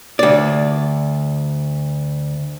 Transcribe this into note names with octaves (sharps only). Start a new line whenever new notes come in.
D2 D5